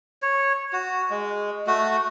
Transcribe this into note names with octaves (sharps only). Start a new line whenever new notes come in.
C#5
F#4
G#3
A3 F#4